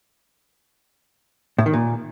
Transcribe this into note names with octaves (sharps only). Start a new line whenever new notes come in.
A2
D#3
A#2